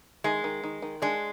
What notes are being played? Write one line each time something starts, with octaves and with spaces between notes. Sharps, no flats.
D#3 G#3
D#3
D#3
D#3
G#3 D4